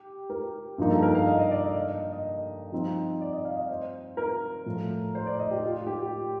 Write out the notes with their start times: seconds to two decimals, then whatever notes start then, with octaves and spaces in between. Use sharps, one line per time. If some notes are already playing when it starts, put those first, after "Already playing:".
Already playing: G4
0.30 A#4
0.78 G2 F3 A#3 D#4
0.91 A4
1.02 A#4
1.15 F5
1.27 D#5
1.39 D#5
1.51 D5
1.64 D#5
1.88 D#5
2.12 D#5
2.72 F3 C4 D#4
3.21 D5
3.33 D#5
3.45 F5
3.57 D#5
3.69 C5
4.17 A#4
4.66 A2 F3 A3
5.15 C5
5.26 D5
5.39 D#5
5.51 G4
5.63 F4
5.87 G4